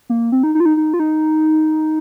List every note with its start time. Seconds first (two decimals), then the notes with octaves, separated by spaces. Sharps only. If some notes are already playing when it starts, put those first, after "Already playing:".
0.10 A#3
0.32 C4
0.43 D#4
0.55 D#4
0.60 F4
0.65 D#4
0.77 D#4
0.94 F4
0.99 D#4